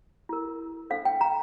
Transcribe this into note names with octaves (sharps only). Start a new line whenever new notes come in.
E4 A#4
D4 A4 C5 F5
G5
A#5